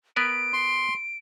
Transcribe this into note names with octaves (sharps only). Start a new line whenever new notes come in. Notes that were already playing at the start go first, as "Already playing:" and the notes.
B3 A#4 B4 D7
C6